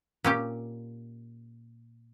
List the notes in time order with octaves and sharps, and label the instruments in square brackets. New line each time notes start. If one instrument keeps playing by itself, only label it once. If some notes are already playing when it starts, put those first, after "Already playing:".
[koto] A#2 C#4 G4